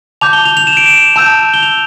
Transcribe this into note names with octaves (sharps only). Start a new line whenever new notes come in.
A5 D6 G6 F7
G7
F7
F7
E7
D7
E7
A5 E6 G6
G7
F7